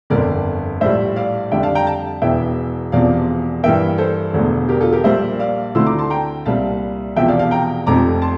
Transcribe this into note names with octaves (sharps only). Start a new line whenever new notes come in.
G1 F2 D3 A#4 D5
A#1 A2 G3 C5 E5
D5 F5
F2 D3 G3 D4 E5 G5
F5 A5
G5 A#5
F5 A5
E1 E2 E3 E5 G5
E1 E2 C3 F3 C4 D5 F5
G2 E3 A#3 E5 G5
A4 C5
E1 E2 D3 A3
G4 A#4
F4 A4
G4 A#4
A#1 A#2 G3 A#3 C5 E5
D5 F5
D2 D3 A3 C4 E4 C6 E6
A#5 D6
A5 C6
G5 A#5
C2 A#2 G3 C4 F5 A5
E1 E2 C3 F3 E5 G5
D5 F5
F5 A5
G5 A#5
F1 F2 C3 F3 C4 A#5 D6
A5 C6